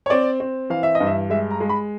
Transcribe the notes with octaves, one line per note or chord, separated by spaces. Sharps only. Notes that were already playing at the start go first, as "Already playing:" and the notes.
C#5
C4 D5
C4
E3 F5
E5
D#5
G2
E5
G#3 E5
A#5
G#3
B5